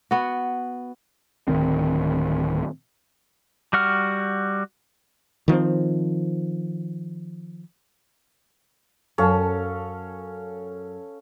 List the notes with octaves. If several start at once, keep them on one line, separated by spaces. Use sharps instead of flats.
B3 F#4
D1 E2 D#3 C4
G3 F#4 F#5 F6
D#3 F3 A#3 C4
F#2 C#4 A4 F5 A5